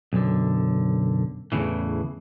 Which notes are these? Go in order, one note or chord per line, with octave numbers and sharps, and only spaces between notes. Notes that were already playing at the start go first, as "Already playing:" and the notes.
B1 F#2 D3
E2 A2 C#3 E3